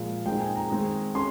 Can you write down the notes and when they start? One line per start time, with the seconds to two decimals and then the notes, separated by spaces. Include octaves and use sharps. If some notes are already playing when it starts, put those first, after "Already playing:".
Already playing: A#2 F3 G#3 F5
0.25 A#2 G#3 C4 D#4 G5
0.40 G#5
0.55 A#5
0.70 D#3 G#3 C4 D#4
1.15 C#4 C6